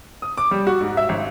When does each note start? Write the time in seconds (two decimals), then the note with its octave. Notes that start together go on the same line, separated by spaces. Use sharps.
0.22 D#6
0.38 D6
0.51 G3
0.67 F#4
0.81 G#2
0.97 E5
1.09 G#1